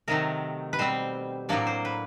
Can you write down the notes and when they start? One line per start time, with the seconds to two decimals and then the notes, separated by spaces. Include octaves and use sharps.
0.08 C3 D#3 F#3 A3 A#4
0.73 B4
0.79 B2 G3 C4 C5
1.49 A2 F#3 A#3 D4 D5
1.67 C5
1.85 B4